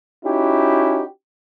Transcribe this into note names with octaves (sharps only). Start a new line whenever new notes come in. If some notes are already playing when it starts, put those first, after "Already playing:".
C#4 D#4 E4 F#4 G4